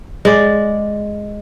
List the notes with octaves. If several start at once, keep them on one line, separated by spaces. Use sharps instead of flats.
G#3 D5